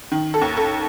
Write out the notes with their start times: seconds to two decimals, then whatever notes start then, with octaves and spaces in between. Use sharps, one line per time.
0.12 D#3
0.34 A4
0.41 D#2
0.57 A4